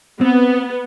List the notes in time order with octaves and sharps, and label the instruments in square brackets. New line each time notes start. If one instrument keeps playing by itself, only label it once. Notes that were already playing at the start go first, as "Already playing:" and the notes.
[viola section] B3 [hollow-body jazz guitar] C4